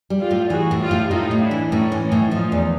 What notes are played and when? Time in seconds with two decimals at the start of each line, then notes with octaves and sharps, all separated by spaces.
0.10 G3
0.20 F4 G4
0.31 A2
0.50 E3 F#4 G#4
0.71 A2
0.80 F4 G4
0.91 A2
1.11 A2 D#4 F4
1.31 A2
1.41 D4 E4
1.51 E3
1.71 A2 C#4 D#4
1.92 E3
2.02 C#4 D#4
2.12 A2
2.31 F3 D#4 F4
2.52 E2